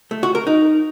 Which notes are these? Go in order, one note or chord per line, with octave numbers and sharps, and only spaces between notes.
A3
F#4
A#4
D#4